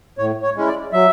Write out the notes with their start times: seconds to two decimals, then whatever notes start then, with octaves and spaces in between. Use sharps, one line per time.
0.18 A2 C#5
0.43 C#5
0.56 G#3 C#4 E4
0.67 D5
0.93 F#3 E5